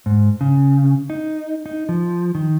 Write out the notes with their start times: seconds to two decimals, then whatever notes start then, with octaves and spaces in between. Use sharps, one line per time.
0.06 G#2
0.41 C#3
1.10 D#4
1.66 D#4
1.89 F3
2.35 D#3